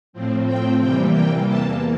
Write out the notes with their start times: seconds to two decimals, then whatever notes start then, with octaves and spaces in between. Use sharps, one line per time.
0.13 A2 F3 C4
0.47 G5
0.80 C3 E3 G3 A#3 G5
1.13 G5
1.47 E2 E3 A#3 A5